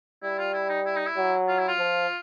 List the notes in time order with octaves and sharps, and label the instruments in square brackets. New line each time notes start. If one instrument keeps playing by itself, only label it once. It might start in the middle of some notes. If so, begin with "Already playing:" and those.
[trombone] G3 [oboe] E4
[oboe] F4
E4
D#4
E4
D#4
E4
[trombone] F#3
[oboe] F4
E4
F4
[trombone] F3